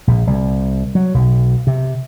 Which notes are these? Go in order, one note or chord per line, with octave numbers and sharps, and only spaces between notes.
A#1
C2
F#3
B1
C3